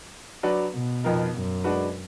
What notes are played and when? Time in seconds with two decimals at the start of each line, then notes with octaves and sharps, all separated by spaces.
0.43 F#3 D4 F#4 B4 D5
0.74 B2
1.04 F2 F3 B3 D#4 A#4
1.34 F#2
1.64 G#3 D4 F#4 B4